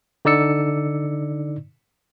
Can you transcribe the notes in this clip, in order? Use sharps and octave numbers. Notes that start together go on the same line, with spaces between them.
D3 D#4 D5 E6 C#7